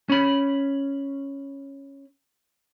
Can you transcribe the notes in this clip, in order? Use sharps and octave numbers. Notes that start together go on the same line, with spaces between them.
C#4 B5